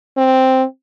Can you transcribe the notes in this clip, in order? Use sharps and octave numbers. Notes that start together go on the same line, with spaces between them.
C4